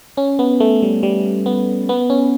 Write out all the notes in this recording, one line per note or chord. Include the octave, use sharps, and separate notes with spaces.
C#4
B3
A3
G3
G3
B3
B3
C#4